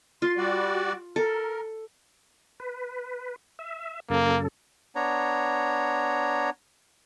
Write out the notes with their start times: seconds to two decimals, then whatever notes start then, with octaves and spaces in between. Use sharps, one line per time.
0.22 F4 C6
0.37 G3 F#4 D5
1.16 A4 A#4
2.60 B4
3.59 E5
4.10 F#2 C#3 A#3 A4
4.96 B3 D4 C#5 A#5